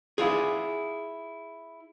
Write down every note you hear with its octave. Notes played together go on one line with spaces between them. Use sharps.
E4 F4 G#4